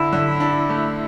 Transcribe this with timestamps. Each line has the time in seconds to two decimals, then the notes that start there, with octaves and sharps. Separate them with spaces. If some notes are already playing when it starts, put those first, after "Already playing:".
Already playing: D3 E4
0.13 D3
0.40 D4
0.69 A3